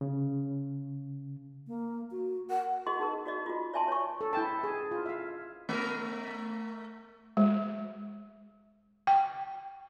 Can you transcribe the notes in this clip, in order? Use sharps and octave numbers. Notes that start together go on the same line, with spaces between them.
C#3
A#3
F#4
A#4 F#5
F#4 G#4 D#5 C6
D#4 G#4 A#4
F#4 D5 D#5
F4 F#4
D5 E5 G#5 A5 C6
C#5 C#6
A4
E4 G5 A5
G#4
F4
E5 F5
A3 A#4
G#3
G5